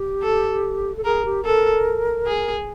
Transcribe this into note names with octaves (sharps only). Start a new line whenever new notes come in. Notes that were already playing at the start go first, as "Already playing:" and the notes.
Already playing: G4
A4
A4
G#4 A#4
G4
A4 A#4
G#4